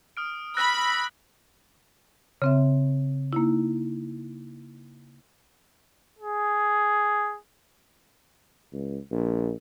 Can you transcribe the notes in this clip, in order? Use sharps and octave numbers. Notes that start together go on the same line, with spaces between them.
D#6 F6 D7
B5 E6 F#6 A#6
C#3 C4 E5
A#3 D#4 E4
G#4
C#2
A#1